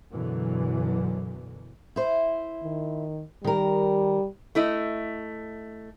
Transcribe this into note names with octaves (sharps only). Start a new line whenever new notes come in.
F#2 B2 D3 E3 F#3
E4 C5
D#3
D#3 G3 A#4
A3 E4 D#5